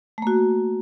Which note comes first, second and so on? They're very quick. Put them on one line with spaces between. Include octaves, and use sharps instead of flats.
A3 A#3 F#4